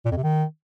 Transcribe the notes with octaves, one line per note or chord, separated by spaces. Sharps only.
A#2
F2
C3
D#3